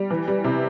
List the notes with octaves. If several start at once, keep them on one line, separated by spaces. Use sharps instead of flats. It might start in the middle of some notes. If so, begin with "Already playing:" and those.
Already playing: G3
E3
G3
C3